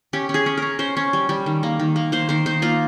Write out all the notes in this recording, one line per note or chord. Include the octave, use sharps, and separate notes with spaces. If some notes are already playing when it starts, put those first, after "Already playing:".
C#4 G4
C#4
G#4
C#4
C#4 A#4
C#4 C5
C#4
G3
G3
D#3
A#3
D#3
A#3
A#3 C5
D#3 C5
D#4 C5
A#3 F4